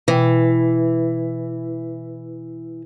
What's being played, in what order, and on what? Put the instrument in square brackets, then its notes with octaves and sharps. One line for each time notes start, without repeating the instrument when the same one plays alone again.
[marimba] B2 G5 [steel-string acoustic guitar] E3